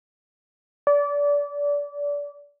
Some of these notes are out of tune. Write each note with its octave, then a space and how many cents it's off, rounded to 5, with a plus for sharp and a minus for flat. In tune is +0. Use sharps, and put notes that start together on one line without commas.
D5 -30